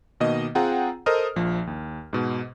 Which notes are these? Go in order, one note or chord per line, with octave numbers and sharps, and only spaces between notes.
B2 D#3 A#3 D#5
C4 F4 G#4 F#5 G5 A#5
A4 A#4 C5 D#5 D#6 F6
A#1 F3
D#2
G#2 B2